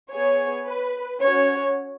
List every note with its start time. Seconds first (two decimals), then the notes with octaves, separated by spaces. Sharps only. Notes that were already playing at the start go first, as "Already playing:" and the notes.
0.11 B3 G#4 C#5
0.66 B4
1.20 C#4 F#4 C#5